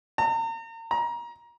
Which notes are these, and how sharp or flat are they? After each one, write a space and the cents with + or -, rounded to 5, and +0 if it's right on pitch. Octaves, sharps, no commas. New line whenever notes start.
A#5 -40
A#5 +25